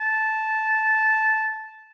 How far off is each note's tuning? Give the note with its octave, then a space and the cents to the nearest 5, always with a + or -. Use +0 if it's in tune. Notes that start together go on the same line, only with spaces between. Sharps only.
A5 -10